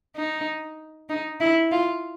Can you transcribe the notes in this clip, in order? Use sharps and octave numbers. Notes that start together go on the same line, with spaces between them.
D#4
D#4
E4
F4